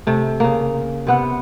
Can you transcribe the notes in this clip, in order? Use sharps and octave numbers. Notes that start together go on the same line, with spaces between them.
C3 A3
C#3 A#3
C3 B3 F#5